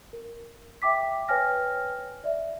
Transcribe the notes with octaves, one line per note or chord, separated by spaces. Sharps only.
A#4
E5 G5 D6 B6
B4 C#5 G5 G#5 F6 A#6
D5 E5